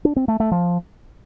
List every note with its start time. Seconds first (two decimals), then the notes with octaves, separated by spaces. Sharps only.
0.05 D4
0.16 C4
0.28 A3
0.40 A3
0.51 F3